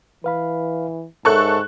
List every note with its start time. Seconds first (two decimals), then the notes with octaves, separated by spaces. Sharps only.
0.24 E3 B4 F5 B5
1.25 G#2 A4 A#4 C#5 E5 C#6 F#6